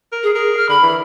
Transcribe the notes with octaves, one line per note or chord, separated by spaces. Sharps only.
A#4
G#4
G#4 A#4
F6
D3 B5
E3